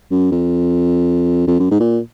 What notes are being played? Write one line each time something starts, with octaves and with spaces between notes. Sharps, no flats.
F#2
F2
F2
F#2
G#2
A#2